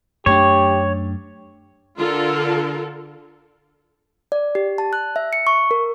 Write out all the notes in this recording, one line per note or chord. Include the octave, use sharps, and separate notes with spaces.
F#2 A3 D4 G4 C#5
D3 F4 A4 A#4
D5
G4
A5
F#6
E5
C#7
C#6
A#4